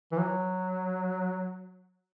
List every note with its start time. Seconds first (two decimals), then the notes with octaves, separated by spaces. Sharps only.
0.12 E3
0.18 F#3